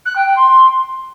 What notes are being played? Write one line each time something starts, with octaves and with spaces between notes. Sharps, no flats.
F#6
G5
G5
C6